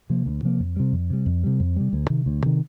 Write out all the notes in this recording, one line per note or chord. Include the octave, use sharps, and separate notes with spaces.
C3 F3 A#3
D2
C3 F3 A#3
F2
C3 G3
F2
C3 G3
F2
C3 G3
F2
C3 G3
D2
C3 D#3
D2
C3 D#3